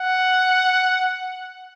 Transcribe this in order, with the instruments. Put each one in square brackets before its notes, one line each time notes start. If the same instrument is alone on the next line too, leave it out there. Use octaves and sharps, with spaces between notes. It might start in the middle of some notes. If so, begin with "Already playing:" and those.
Already playing: [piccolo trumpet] F#5